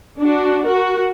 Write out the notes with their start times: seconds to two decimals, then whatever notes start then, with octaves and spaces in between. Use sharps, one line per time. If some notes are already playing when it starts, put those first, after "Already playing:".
0.19 D4 F#4
0.66 F#4 A#4